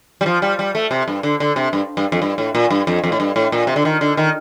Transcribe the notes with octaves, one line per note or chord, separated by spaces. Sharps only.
G3
F3
G3
G3
A3
C3
G2
D3
D3
C3
G2
G2
F2
G2
A2
A#2
G2
F2
F2
A2
G2
A2
A#2
C3
D3
D#3
D3
D#3